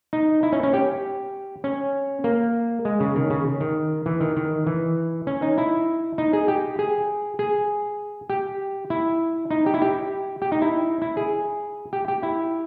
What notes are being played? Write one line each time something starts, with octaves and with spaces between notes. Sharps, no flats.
D#4
E4
C#4
C#4
G4
C#4
A#3
G#3
C#3
D#3
C#3
D#3
E3
D#3
D#3
E3
C#4
D#4
E4
D#4
G#4
G4
G#4
G#4
G4
E4
D#4
G4
E4
G4
G4
D#4
E4
E4
G#4
G4
G4
E4